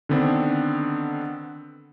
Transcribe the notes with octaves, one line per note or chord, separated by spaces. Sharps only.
D3 D#3 B3 C4 D4